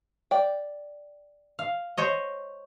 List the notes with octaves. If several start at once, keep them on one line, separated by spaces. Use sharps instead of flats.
D5 G5
F5
C5 C#5 D#5